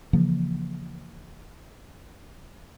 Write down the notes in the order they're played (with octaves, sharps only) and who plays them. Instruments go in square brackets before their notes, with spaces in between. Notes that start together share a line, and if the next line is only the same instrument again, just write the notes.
[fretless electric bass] C#3 E3 F3 A#3